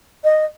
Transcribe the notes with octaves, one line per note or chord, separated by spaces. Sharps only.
D#5